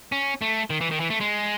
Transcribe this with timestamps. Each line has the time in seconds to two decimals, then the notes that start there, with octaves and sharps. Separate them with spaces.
0.12 C#4
0.42 A3
0.70 D#3
0.81 E3
0.91 D#3
1.00 E3
1.10 A3
1.20 G#3